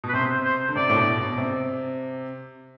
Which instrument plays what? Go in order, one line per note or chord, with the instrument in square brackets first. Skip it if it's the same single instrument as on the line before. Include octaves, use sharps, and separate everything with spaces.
[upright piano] B2
[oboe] B4
[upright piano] C3 [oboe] C5
[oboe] C5
[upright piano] D3
[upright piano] C3 [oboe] D5
[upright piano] A2
B2
B2
C3